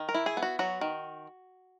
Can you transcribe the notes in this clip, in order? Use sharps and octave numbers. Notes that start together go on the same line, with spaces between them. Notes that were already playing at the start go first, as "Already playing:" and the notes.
Already playing: D#3
A#4
E4
G#4
B3
F#4
F#3 F#4
D#3